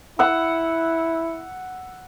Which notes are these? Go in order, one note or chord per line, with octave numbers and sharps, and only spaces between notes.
E4 F#5 E6